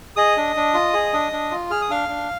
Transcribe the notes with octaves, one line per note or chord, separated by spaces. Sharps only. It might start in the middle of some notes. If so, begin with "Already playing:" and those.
G#4 D#5 D#6
D4
D4
F4
G#4
D4
D4
F4
G#4 F6
D#6
D4 F5 F6
D4